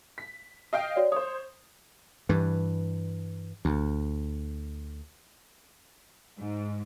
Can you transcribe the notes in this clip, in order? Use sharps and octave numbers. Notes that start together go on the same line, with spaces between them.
B6
D#5 F5 G5
F#4 C#5 D5
C5 C#5 D#6
G2 E3
D2
G#2